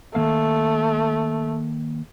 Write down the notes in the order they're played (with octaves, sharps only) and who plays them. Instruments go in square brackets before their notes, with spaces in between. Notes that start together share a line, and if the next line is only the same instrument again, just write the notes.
[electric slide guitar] D#3 A#3 F5 [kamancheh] A3